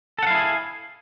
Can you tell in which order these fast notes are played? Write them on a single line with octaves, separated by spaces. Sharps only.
A4 F#5 F5 E4 G#4